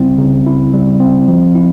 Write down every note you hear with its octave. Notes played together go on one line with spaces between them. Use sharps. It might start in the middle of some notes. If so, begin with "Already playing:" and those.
Already playing: C#3 G3 C4 E4
C#3
E4
G3
C4
F3
E4